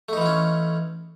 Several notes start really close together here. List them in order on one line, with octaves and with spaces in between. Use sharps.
A3 D#4 E3 F4 C#4